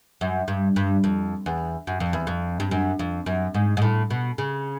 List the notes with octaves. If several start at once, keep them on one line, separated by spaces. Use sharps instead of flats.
F#2
G2
G2
F2
E2
F#2
F2
E2
F2
G2
F#2
F2
F#2
G#2
G#2
A2
B2
C#3